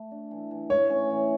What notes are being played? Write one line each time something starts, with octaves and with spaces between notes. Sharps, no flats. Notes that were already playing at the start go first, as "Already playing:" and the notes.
Already playing: A3
D4
E3
E3
A2 C#5
C#4
E3